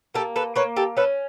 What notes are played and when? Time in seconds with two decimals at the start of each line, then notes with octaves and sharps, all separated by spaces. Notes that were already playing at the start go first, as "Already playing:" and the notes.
0.15 A#3 G4 A4
0.36 A4 B4
0.56 A#3 B4 C#5
0.76 G4 A4
0.97 C#4 A4 B4